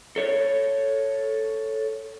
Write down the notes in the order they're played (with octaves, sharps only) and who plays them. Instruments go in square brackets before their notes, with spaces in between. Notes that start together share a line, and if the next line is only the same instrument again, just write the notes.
[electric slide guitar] A4 C#5